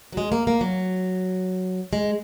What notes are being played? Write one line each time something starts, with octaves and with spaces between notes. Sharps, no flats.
F#3
G#3
A#3
A#3
F#3
G#3